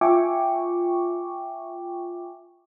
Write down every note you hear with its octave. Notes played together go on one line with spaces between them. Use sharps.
F4 E5 G5 G#5 C#6 D6